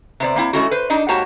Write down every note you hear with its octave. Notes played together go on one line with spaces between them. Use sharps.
C3 B3 C5 D5
A#3 C4 E4
G#3 A3 C#4 E4 F#4
B4 C5
D4 D#4 G#4 D#5
G#2 A#3 F#4 G4 C#5 A5